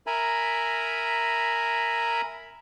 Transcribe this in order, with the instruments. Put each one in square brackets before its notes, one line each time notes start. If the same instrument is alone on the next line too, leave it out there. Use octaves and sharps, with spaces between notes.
[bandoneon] A#4 E5 G#5 A#5 B5